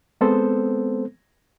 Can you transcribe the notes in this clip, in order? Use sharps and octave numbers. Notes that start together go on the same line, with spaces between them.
G#3 B3 C4 A4 C5